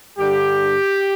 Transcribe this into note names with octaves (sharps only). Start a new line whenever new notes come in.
G2 D3 G3 G4